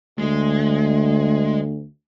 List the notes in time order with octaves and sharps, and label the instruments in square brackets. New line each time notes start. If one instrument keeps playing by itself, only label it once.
[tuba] D2 [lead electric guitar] G#3